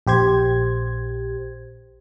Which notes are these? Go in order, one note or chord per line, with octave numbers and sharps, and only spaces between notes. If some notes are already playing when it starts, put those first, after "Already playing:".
A#1 G4 C5 G#6